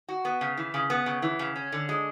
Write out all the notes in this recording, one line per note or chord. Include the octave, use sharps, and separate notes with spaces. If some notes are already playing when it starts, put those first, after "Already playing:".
F#4
B3
C#3
E3
C#3
B3
C#3
E3
C#3
C#4
D3
G#3